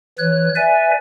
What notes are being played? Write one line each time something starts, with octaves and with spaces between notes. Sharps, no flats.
E3 B4 C#5 F#6
B4 D5 E5 G#5